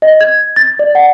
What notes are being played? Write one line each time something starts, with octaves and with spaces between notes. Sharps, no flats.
D#5
G#6
A6
D5
F#5